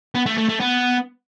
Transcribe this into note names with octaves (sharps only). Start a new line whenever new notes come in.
B3
A3
A3
A3
B3